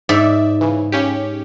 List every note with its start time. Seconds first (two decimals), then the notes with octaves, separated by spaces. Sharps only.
0.09 G#2 D5 E5
0.61 C#3 E3
0.92 C#3 C#4 G4